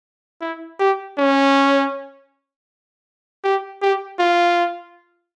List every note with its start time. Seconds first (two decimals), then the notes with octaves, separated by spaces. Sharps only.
0.41 E4
0.80 G4
1.18 C#4
3.44 G4
3.82 G4
4.20 F4